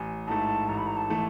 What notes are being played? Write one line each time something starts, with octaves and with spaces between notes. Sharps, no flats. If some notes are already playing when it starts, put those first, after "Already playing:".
Already playing: A1 G#5
G#2 E3 A3 A5
A1 A#5
B5
A#5
A5
E3 A3